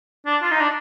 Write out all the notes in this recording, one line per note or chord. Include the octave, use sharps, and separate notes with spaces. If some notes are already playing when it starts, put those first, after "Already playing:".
D4
F4
D#4
D4